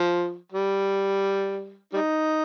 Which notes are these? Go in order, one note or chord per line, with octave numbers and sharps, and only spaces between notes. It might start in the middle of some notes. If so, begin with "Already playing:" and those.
Already playing: F3
G3
G3 D#4